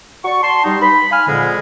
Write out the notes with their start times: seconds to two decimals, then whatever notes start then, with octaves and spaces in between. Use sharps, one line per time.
0.24 F#4 D5 C#6
0.43 A5 C6
0.64 G3 D#4
0.81 B5
1.11 F5 G#5 B5 F6
1.28 F2 A#2 D3 G#3